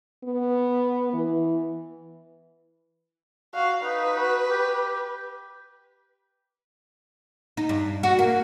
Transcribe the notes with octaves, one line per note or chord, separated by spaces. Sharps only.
B3
E3
F#4 F5
D#4 B4
F#4
G4
D#4
G2
F#4
A#3